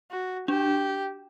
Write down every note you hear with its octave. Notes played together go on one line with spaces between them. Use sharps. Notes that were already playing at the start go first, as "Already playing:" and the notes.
F#4
D4 G4